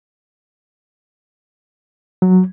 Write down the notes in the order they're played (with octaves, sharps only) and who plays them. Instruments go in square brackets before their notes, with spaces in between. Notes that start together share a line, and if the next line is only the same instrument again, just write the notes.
[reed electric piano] F#3